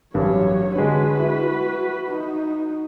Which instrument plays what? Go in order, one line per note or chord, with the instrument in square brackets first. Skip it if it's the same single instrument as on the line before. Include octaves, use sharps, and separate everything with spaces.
[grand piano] A1 G2 [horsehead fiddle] F#3 C#5
[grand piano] D3 G#3 [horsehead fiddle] F#4 B4
[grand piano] E4
[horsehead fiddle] D#4 F#4